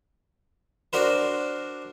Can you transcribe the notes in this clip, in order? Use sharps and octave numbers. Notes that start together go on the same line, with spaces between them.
D4 F#4 A#4 C5